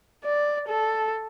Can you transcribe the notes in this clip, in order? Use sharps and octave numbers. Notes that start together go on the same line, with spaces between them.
D5
A4